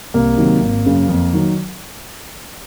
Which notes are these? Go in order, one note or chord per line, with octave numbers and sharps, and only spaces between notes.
C2 A#3
C3 D#3 F#3
G#1
F#2 C#3
F2
D#3 F#3